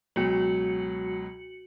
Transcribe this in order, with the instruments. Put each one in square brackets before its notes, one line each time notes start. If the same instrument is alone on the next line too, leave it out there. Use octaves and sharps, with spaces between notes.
[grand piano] C#2 B2 F#3 [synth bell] F#4 C#7 F#7